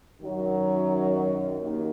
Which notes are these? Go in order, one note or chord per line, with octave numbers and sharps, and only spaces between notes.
F#2 D#3 F#3
D#2 D#3 A#3